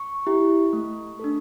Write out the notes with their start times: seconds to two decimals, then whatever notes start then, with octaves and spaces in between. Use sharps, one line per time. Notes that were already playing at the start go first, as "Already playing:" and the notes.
Already playing: C#6
0.27 E4 G4
0.73 A3
1.20 D4 A4